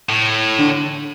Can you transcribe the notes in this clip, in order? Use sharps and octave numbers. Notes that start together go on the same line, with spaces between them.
A2
D3